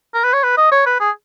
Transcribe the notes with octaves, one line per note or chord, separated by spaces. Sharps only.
A#4
B4
C#5
B4
D#5
C#5
B4
G#4